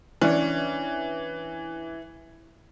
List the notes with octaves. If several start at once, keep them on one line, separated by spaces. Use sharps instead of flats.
E3 C#4 D4